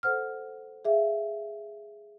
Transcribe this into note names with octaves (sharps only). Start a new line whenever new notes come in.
A4 C5 F#5 F6
G#4 E5 F5